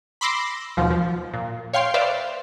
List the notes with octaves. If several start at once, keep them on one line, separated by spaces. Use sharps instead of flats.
B5 C6 D6 E6 A#6 C7
D#2 B2 F3
F3
A#2
C#5 F5 G5 C6
B4 C5 D5 E5 F5